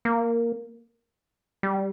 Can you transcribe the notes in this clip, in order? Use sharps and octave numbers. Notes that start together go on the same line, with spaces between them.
A#3
G3